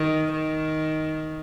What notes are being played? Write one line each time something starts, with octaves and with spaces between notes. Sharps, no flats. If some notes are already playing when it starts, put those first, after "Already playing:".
Already playing: D#3
D#3